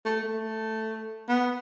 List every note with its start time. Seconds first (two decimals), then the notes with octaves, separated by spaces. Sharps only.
0.05 A3
0.24 A3
1.29 B3